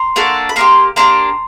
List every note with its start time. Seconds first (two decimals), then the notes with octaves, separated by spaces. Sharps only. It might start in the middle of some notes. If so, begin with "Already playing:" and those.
Already playing: A#5 C6
0.16 A#3 D4 F#4 A4
0.49 B5
0.56 A#3 D4 G4 A#5 C6
0.96 A#3 D4 G4 A#5 C6